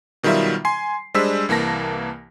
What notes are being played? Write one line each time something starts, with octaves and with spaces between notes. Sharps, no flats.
B2 D#3 F#3 G3 F4 E5
G#5 C6 C7
G3 G#3 D4 C5 E6 B6
C2 E3 A#3 A5 A#6